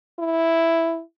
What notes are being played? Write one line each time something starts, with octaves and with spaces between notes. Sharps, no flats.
E4